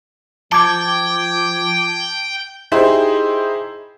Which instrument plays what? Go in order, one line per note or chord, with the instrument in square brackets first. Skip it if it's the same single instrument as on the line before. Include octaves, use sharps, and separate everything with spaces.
[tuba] F3 [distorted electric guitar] G5 [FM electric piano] A5 D6 G#6
[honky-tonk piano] D#4 E4 G4 G#4 C5